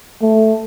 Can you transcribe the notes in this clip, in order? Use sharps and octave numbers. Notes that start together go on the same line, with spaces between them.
A3